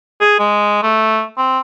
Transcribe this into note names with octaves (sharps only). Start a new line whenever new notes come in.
G#4
G#3
A3
C4